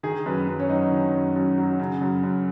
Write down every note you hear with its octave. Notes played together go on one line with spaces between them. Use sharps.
D#3 G#4
F#2 B4
F#2
C#4
F#3 D#4
D#3
F#2
F#2
F#3
C#3
F#2
F#2